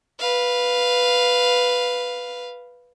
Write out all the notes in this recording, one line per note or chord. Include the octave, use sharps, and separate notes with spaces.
B4 F5